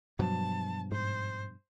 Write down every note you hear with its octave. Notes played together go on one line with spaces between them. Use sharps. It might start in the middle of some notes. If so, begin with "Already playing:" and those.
G2 B2 F3 F#3 A5
G#2 C5